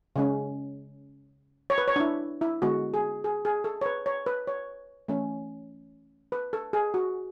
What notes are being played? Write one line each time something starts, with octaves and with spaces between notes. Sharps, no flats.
C#3 G#3 C#4
C#5
B4
C#5
D4
E4
E4
D3 G#3 B3 F#4
G#4
G#4
G#4
A4
C#5
B4
C#5
B4
C#5
E3 A3 C#4
B4
A4
G#4
F#4